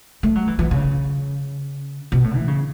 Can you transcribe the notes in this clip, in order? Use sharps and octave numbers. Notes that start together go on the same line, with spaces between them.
A3
F#3
E3
E3
C#3
B2
A2
E3
C#3